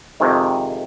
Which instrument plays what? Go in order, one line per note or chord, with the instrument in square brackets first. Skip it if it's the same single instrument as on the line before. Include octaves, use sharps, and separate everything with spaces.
[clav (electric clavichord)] F2 C3 D#3 G#3